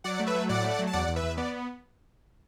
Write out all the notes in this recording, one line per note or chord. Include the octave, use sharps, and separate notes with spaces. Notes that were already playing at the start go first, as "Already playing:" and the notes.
F#3 D5 F#5
A3
B4 E5
F#3
A2 D5 F#5
A3
F#3
A5
E2 D5 F#5
E2
B4 E5
E2
B3 D5